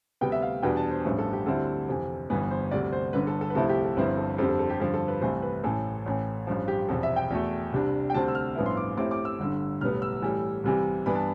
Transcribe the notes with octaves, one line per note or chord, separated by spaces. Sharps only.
D2 C3 G3 B3 G5
E5
F5
E2 B2 G3 B3 D4 G5
A5
C5
A1 G2 F3 A3 B4
A4
G4
D2 D3 G3 C4 E4 A4
F2 C3 E3
G1 G2 E3 B3 B4
C5
D2 C3 G3 D5
C5
G1 G2 D3 B4
A4
A4
B4
C2 C3 F3 A3 E4 A4
G4
A4
G1 G2 F3 C4 E4 B4
A4
F2 D3 G3 C4 A4
A4
A4
G4
G2 D3 F3 A4
A4
B4
C2 C3 E3 A3 C5
B4
A1 A2 E3 A4
A1 A2 E3
A1 G2 F3
G4
E1 E2 C3 F3 A4
E5
G5
E2 B2 A3
C2 C3 G3 D4
G5
D2 C3 G3 C4 A5
E6
F6
A1 G2 F3 B3 E4
C6
D6
A2 G3 C4 E4 D6
D6
E6
G1 G2 D3
B1 A2 G3 B3 F6
E6
A2 E3 G3
C2 C3 E3 G3
G2 E3 B3 D4 B5
A5